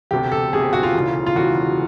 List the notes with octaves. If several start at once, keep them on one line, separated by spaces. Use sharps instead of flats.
E1 D2 C3 G4
A4
E1 D2 C3 G#4
G4
F#4
F4
E1 D2 C#3 E3
F4
E1 D2 C#3 E3 F#4